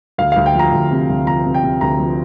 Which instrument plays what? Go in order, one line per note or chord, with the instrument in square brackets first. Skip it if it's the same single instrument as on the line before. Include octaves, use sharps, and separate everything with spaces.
[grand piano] D2 F5
D2 F5
G5
F3 A#5
D2
C3
D2
F3 A#5
C3
G5
C3
D2 A#5
F3